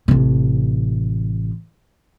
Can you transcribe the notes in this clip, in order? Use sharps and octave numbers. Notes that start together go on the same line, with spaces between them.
A1 C3